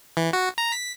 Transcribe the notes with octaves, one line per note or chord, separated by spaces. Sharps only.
E3
F#4
A#5
B6